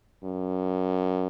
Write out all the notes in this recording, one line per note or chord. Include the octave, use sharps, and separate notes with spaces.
F#2